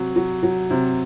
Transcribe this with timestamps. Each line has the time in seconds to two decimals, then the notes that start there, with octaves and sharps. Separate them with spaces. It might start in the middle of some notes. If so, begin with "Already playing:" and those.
Already playing: C3 F#3
0.16 F#3
0.43 F#3
0.70 C3